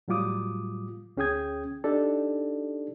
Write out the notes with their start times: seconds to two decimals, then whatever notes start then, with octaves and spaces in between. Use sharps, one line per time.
0.08 A2 F#3 G3 F4 D6 D#6
1.17 D2 C#4 G#4 G5 D#6 G#6
1.84 D4 D#4 G4 A4 D5